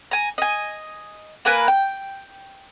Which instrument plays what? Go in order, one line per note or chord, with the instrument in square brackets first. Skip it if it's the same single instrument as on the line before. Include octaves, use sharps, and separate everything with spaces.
[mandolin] G#5 A#5
D#5 G#5
A#3 A#4 B4 G#5
G5